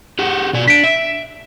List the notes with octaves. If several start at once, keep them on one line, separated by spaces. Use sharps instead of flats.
G4 G#4 F#5
B2 D5 G#5
D4 B6 D7
E5